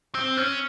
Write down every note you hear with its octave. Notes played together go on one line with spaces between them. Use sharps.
C4
C#4